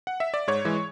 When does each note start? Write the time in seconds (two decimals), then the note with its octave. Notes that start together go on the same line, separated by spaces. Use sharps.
0.07 F#5
0.20 E5
0.34 D5
0.48 G#2 C#5
0.65 E3 G#3